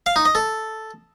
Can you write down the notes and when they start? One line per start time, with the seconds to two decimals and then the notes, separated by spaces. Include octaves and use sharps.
0.06 F5
0.16 D#4
0.25 D#5
0.35 A4